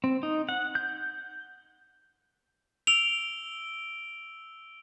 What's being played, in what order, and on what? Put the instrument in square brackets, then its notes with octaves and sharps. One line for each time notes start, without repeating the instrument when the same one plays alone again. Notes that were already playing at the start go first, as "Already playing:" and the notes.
[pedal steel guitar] C4
D#4
F#5
G6
[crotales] E6 D7 G7 [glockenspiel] F7